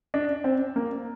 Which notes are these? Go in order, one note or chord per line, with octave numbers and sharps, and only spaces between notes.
D4
C4
A#3